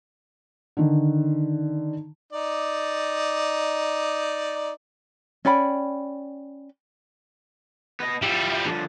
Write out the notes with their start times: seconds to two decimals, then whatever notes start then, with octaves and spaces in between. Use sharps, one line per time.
0.77 D3 D#3
2.33 D#4 D5
5.45 C#4 D5 G5 B5
8.00 B3 D#5
8.22 F3 G3 E5
8.66 D3 F3